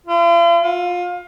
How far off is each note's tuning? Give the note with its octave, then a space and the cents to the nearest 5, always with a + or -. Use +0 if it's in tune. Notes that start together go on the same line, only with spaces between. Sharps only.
F4 -45
F4 +25